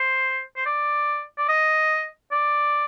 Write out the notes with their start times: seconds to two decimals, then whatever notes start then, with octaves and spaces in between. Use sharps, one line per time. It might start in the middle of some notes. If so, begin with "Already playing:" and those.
Already playing: C5
0.56 C5
0.66 D5
1.38 D5
1.49 D#5
2.32 D5